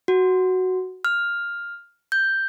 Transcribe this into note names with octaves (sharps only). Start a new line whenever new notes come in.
F#4
F6
G6